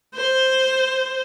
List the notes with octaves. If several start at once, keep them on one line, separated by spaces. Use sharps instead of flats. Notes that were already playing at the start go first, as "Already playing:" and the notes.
C5